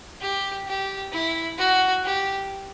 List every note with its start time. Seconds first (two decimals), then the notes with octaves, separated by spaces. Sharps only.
0.21 G4
0.67 G4
1.12 E4
1.58 F#4
2.03 G4